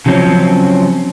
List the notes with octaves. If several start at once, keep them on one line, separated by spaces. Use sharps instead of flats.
C#3 F3 F#3 A3 C4 C#4